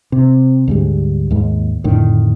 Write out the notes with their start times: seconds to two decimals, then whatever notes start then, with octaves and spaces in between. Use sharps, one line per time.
0.12 C3
0.68 D2 G#2 G3
1.31 D#2 G#2
1.84 F2 A2 D3 D#3